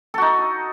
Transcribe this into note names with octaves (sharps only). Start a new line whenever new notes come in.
D#4 F#4 A4